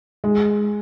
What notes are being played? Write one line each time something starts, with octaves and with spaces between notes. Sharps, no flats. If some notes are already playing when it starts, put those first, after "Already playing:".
G#3